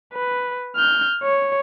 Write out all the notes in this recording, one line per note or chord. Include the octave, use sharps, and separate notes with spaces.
B4
F6 G6
C#5